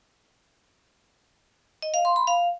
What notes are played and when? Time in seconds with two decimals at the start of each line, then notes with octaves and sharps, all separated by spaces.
1.82 D#5
1.94 F5
2.05 C6
2.16 B5
2.27 F5